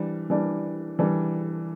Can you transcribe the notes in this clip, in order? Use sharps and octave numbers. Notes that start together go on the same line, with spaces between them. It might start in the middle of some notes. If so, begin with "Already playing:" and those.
Already playing: E3 G3 D4
E3 G3 D4
E3 G3 D4